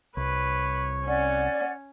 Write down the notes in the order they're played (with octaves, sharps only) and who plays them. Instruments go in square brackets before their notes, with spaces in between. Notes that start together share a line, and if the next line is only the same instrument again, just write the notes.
[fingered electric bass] C2 [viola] B4 [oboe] C#5
[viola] C#4 [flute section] D5 F#5